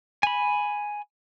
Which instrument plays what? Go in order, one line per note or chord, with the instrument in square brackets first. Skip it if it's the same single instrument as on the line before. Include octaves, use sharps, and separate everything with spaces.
[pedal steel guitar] G#5 B5